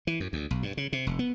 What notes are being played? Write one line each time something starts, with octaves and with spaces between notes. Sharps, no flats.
E3
F#2
D2
B1
G2
C#3
C3
F1
B3